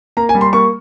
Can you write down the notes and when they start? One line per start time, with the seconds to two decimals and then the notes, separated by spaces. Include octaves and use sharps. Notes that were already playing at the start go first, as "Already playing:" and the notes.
0.17 A#3 A#5
0.29 G#5
0.35 G3
0.41 C6
0.53 A#3 C#6